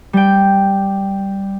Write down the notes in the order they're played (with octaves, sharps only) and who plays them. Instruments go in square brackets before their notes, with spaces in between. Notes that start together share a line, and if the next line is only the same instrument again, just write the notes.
[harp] G3 G5